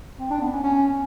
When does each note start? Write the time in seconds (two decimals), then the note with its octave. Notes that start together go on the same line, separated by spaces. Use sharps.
0.19 C4
0.30 D4
0.41 B3
0.52 C#4
0.63 C#4